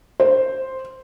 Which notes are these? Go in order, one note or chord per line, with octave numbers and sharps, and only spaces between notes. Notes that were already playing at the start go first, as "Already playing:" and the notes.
C5